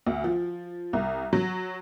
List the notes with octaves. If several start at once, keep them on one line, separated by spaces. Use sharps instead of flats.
D2
F3
C2
F#3